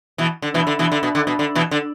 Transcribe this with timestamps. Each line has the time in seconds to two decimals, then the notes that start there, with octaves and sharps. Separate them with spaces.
0.18 B2 E3
0.42 D3
0.54 B2 E3
0.67 D3
0.79 B2 E3
0.92 D3
1.03 B2
1.15 D3
1.27 B2
1.39 D3
1.55 B2 E3
1.71 D3